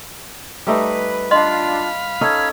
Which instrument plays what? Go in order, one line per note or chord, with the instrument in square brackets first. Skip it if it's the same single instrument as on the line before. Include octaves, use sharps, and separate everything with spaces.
[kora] G3 A3 D#4 [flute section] B4
[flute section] D4 F4 [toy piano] D#5 C6 [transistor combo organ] F5 B5
[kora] C#4 D#4 A4 [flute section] G#6